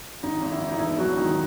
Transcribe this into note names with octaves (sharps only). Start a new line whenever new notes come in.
G#1 D#4
G#1
E4
E3
D#4
E1 E4
F#3 F#4
D#3 D#4